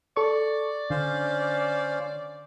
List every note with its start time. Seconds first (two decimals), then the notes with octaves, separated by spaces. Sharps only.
0.17 A4 D5 C#6
0.90 D3 C#4 C5 F5